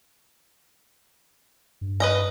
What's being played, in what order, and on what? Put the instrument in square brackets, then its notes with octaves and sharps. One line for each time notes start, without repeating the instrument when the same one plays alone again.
[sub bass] G2
[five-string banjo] B4 D#5 A#5